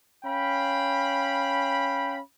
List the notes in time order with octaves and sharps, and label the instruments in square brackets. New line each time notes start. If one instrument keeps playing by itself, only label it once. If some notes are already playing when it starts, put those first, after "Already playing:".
[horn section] C#4 F5 G5 B5